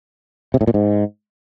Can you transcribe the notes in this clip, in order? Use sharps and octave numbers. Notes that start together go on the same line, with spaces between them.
C3
A2
A#2
G#2